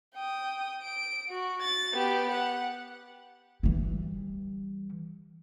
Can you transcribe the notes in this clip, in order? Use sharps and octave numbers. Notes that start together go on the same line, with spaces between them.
G5 D#6
D7
F#4
A6
B3 G4
F#5
E3 G3